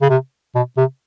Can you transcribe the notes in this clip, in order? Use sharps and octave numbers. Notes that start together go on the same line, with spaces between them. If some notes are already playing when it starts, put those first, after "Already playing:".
C#3
C3
B2
C3